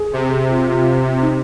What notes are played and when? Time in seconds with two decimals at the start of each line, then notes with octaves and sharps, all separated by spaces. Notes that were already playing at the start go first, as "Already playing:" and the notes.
Already playing: G#4
0.13 C3
0.49 F4
1.21 D#4